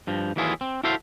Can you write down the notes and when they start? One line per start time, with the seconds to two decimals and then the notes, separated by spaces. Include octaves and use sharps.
0.07 G2 F3
0.36 D#2 E3 F#3 E4 F4 G#4
0.61 C4
0.84 E4 F#4 A4 C5 E5 F5